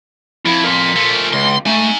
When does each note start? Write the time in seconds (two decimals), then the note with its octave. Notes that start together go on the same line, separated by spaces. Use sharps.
0.46 F2 E4
0.64 A#4 C6
0.96 F3 A3
1.33 C#2 C6
1.66 A3 D#4 G#5